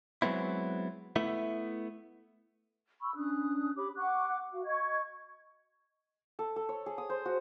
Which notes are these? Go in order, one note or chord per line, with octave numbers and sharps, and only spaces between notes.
F#3 G#3 B3 C4 E4
A3 B3 E4 E5
B5 C#6 E6
C#4 D4 D#6 F#6
G4 C#5 B5 D6
F#5 C#6 D6 F#6
F#4 F5
D#5 C#6 G#6
A4
A4
C#5
G#4
D#6
C5
F#4